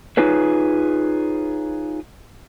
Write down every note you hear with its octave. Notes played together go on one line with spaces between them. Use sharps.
D#4 F4 G#4 B4 C#5